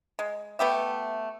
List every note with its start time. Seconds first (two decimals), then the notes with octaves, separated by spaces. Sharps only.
0.19 G#3
0.59 A3 B3 G4 E5